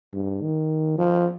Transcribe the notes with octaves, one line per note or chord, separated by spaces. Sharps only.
G2
D#3
F3